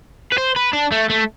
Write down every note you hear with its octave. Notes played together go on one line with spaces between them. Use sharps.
B4
C5
B4
D4
A3
A3